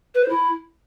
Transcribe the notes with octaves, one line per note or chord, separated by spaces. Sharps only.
B4
C5
E4